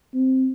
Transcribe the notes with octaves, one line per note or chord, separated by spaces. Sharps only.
C4